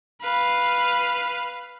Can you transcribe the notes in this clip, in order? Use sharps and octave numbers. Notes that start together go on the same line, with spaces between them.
B4 F5